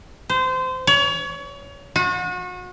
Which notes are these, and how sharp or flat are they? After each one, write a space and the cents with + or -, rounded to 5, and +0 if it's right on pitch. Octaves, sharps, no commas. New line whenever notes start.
C5 -25
C#5 +30
F#4 -35